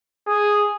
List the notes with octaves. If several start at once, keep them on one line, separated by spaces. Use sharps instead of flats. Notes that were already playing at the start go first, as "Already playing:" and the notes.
G#4